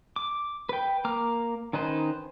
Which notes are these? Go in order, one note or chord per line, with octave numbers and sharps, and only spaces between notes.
D6
B4 G5
A#3 A#5 D6 F6
D#3 C#4 D#4 B4 C5